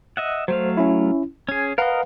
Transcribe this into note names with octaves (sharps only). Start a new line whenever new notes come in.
D#5 E5 F#5
F#3 A3 C5 F5
C#4 E4
C#4 G#4 G#6
A#4 B4 D#5 F5 F#5